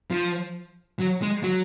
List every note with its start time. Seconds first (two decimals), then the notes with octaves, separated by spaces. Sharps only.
0.11 F3
0.99 F#3
1.22 G#3
1.43 F#3